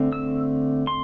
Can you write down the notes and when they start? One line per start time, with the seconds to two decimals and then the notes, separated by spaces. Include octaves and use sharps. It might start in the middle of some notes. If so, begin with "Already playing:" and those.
Already playing: D3 A3 C4
0.12 E6
0.87 C6